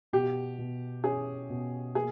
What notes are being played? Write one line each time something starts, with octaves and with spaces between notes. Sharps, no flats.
B2 G4
B2
C#4 G#4
B2
A#3 G#4